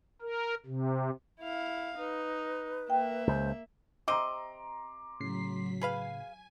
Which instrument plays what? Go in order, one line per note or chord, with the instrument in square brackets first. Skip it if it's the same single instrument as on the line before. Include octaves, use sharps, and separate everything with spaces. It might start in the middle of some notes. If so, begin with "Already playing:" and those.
[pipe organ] A#4
C3
[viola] E4 F5
[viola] D#4 [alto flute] B4
[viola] A#3 E5 [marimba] G5
[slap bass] C#2 [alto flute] C5
[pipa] C3 C4 D#5 [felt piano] A#5 C6 D6
[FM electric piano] A2 C#3 C7 [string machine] F#3 B6
[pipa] G#4 B4 F5 [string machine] G#5